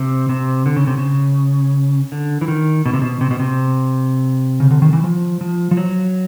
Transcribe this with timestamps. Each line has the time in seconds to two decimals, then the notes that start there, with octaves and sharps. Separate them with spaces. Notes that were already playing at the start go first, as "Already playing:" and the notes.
Already playing: C3
0.29 C3
0.66 D3
0.76 C#3
0.87 C3
0.98 C#3
2.12 D3
2.41 E3
2.48 D#3
2.86 B2
2.93 C3
3.02 B2
3.21 C3
3.31 B2
3.40 C3
4.60 C#3
4.71 D3
4.82 D#3
4.93 E3
5.04 F3
5.41 F3
5.71 F3
5.77 F#3